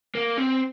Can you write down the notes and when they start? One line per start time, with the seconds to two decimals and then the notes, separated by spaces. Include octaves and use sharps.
0.15 A#3
0.37 C4